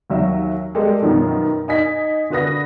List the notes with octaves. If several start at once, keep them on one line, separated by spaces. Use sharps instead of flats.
D#2 F#3 E5
G3 G#3 G4 A4 A#4
F#2 B2 D#3 F3
D#4 G#5 B6
D3 F#4 B4 D#6 A#6